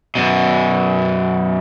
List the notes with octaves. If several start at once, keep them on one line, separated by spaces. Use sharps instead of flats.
F#2 B2